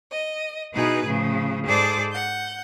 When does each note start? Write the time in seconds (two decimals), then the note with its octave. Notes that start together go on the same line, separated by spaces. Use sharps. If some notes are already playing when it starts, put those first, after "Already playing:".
0.10 D#5
0.73 B2 D#4 E4 G#4 B4
1.06 A2 C#3 F3
1.66 G#2 G#4 A4 C5 D5 D6
2.13 F#5 G6